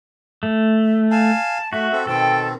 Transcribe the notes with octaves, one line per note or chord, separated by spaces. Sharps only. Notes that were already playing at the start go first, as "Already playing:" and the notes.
A3
F5 G#5 A5
A3 F#4 E5
C4 A4
B2 D#3 C4 A4 G5